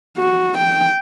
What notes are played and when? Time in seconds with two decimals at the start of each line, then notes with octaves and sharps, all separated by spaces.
0.18 F#4
0.58 G5